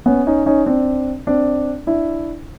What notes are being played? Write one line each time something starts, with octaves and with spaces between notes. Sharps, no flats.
B3 C#4
C#4 D#4
C#4 D#4
C4 D4
C4 D4
D4 E4